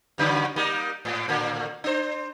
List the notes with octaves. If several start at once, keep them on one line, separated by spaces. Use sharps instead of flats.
G2 C#3 F#3
G3 A#3 D#4
G#2
A2 D3 A#3
D4 C5